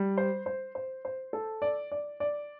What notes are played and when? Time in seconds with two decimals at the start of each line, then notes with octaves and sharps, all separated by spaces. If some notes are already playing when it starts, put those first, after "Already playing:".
Already playing: G3
0.18 C5
0.46 C5
0.75 C5
1.05 C5
1.33 A4
1.62 D5
1.92 D5
2.20 D5